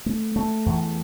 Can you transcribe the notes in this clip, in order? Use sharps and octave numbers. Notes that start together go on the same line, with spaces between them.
A3
A3
E2